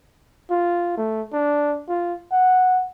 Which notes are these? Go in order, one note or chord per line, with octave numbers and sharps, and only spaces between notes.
F4
A3
D4
F4
F#5